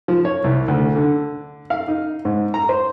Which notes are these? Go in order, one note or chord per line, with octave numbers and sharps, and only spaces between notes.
F3
C#5
C2
D2
D3
F5
D#4
G#2
A#5
C5